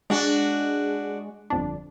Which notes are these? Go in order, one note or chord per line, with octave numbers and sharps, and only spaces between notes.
G#3 D4 F#4
G1 F2 D4